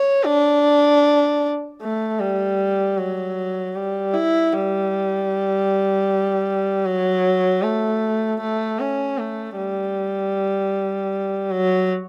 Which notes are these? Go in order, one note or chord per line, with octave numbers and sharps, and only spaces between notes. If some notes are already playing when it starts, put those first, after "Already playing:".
Already playing: C#5
D4
A3
G3
F#3
G3
E4
G3
F#3
A3
A3
C#4
A3
G3
F#3